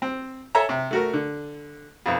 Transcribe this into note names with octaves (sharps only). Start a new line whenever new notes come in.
C4
A4 C#5 E5 G#5 A#5
C3
A3 F#4 A#4
D3
B1 F2